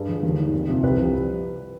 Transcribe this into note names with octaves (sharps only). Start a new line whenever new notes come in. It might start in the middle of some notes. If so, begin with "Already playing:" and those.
Already playing: G2 G#4
D3 F3
D#2
D#3
F2
C3 F3
C2 B4
C3 F3